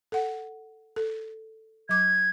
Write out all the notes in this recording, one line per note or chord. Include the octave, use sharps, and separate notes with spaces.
A4 F#5
A4
F#3 D6 G#6